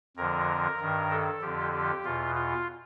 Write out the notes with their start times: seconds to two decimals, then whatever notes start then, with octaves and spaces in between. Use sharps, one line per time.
0.16 F2 D3 F3 A#4
0.80 G2 D#3
1.11 A4
1.41 F2 D3 F3 G4
1.73 G4
2.04 E2 B2 F4
2.35 F4